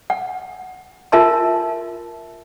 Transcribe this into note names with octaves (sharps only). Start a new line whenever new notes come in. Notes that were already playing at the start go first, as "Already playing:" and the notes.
F#5
F4 A#4 E5 A5 C6